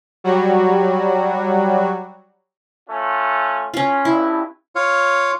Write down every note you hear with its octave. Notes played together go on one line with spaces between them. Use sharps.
F#3 G3 F#4
A3 C#4 F4
C#4 F4
G2 E4
F4 C#5 F5